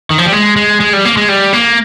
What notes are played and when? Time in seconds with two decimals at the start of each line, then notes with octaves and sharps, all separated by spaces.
0.10 D#3
0.18 F3
0.25 G3
0.32 G#3
0.56 G#3
0.80 G#3
0.93 G3
1.05 A#3
1.17 G#3
1.28 G3
1.53 A#3